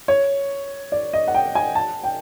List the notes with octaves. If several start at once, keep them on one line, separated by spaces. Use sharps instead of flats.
C#5
D5
D#5
F#5
G5
G#5
A5
G5